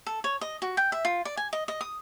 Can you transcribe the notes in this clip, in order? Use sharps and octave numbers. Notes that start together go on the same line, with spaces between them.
A4
C#5
D#5
F#4
G5
E5
F4
D5
G#5
D#5
D#5
D#6